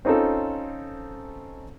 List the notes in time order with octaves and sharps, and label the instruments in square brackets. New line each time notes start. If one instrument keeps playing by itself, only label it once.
[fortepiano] C4 C#4 D#4 F4 A4